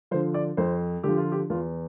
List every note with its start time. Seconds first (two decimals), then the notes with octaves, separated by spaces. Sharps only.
0.11 D3 F3 C5
0.34 D5
0.57 F2 C5
1.04 D3 F3 G4
1.17 F4
1.32 G4
1.50 E2 F4